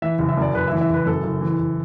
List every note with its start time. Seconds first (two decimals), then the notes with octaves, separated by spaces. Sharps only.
0.02 E3 E5
0.19 F#1
0.29 E5
0.37 F#2 D5
0.54 F#1 B4
0.68 E3 E5
0.81 E5
0.89 F#1 B4
1.06 F#2 A4
1.23 F#1
1.41 E3
1.58 F#1